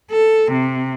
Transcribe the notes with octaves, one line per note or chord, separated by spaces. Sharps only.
A4
C3